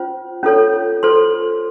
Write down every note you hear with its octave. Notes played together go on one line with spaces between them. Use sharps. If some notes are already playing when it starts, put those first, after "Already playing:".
Already playing: C#4 F4 C5
C#4 F4 A4 C#5
F4 A4 C5 C6